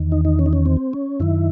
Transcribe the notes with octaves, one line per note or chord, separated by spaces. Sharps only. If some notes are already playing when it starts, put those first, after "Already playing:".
Already playing: E2 D#3
D#4
D#4
C#4
D#4
C#4
C4
C#4
F#2 D#3 E4